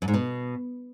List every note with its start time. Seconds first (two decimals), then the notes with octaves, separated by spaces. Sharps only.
0.02 F#2
0.08 G#2
0.14 B2